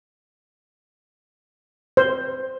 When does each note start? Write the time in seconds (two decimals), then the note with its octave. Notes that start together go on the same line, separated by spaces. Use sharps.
1.97 C5